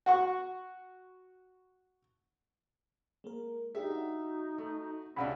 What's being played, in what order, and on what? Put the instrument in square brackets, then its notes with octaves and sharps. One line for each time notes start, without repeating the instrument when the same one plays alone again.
[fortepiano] F#4 F#5 C#6
[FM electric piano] G#3 A#3 A#4
[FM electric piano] D4 G4 G#4 [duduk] D#4 [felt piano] E5
[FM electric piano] F#4
[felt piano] A3
[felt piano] C#2 C3 D4 [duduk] C#4 [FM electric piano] F#5 B5